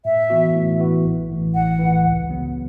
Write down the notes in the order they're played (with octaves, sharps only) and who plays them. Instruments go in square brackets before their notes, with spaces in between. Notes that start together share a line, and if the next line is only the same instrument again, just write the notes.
[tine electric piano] A2 [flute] E5
[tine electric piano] E3 B3 F#4
A2
E3 B3 F#4
A1
A2 E3
[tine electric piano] A1 [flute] F#5
[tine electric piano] A2 E3
C#2
C#3 F#3 B3